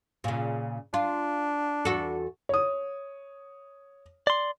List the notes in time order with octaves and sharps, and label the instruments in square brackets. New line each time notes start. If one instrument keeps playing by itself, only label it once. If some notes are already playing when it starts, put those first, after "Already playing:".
[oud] A#2 C#3
[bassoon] D4 [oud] F4
[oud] E2 F#4 A4
[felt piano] C#5 D#6
[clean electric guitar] D5 C6